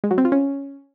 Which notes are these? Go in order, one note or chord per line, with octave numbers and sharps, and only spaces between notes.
G#3
F#3
C4
F4
C#4